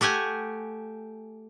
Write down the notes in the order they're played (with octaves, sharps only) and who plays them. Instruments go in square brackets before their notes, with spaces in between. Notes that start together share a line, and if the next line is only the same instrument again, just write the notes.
[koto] A3 G4 F#5 G#5